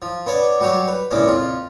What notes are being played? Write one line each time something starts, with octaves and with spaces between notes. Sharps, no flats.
F3
B3 D4 C#5 D5
F#3 G3 F#4 G4 C#5
B4
A#1 C#3 E3 G#3 C#4 D4
F2 F4